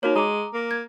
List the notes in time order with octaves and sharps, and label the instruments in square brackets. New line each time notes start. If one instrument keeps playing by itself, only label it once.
[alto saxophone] A#3 [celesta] D#4 F#4 C#5
[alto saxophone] G#3 [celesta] A#5 D6
[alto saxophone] A#3
[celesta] G#6